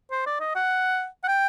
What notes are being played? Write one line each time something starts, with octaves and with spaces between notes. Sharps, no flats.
C5
D5
D#5
F#5
F#5
G5